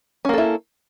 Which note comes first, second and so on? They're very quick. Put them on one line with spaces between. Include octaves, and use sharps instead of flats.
C#4 A#3 A4 E4